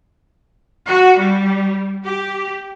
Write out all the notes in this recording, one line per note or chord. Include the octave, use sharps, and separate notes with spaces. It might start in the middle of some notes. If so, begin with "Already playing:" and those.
F#4
G3
G4